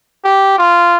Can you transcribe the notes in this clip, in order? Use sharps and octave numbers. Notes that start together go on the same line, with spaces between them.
G4
F4